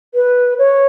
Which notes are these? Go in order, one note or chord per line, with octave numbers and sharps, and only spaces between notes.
B4
C#5